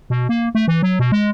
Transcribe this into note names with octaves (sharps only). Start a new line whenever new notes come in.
B2
A#3
A3
E3
F#3
B2
G#3